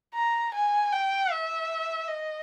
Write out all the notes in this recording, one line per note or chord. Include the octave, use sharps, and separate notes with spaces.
A#5
G#5
G5
E5
D#5